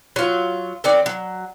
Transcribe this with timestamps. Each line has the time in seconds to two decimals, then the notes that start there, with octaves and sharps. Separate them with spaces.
0.16 F#3 F4
0.84 D#3 F#3 C4 D5
1.06 F#3